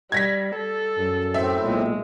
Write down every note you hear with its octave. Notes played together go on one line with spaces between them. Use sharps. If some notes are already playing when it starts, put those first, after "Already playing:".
G3 G#6 A#6 B6
A4
F#2
A2 C4 E5
B1 A#2 G#3